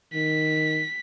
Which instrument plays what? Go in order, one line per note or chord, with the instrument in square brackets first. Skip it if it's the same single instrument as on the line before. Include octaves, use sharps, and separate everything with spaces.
[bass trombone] D#3 [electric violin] B6